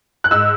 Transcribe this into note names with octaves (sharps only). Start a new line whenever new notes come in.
F#6
G#2 E6